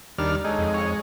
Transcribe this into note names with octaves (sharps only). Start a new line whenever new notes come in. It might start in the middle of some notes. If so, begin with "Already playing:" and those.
D#2 G3 D4 F6
G#3 D#4 A4 C#5
F2
C#5 C#7